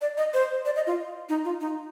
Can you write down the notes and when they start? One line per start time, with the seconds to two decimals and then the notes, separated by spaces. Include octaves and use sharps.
0.02 D5
0.17 D#5
0.34 C5
0.65 D5
0.76 D#5
0.87 F4
1.29 D#4
1.45 F4
1.61 D#4